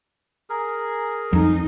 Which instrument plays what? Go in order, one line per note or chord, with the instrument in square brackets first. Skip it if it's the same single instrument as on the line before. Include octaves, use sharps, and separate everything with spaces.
[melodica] G#4 A#4
[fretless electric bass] F2 [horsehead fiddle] D#4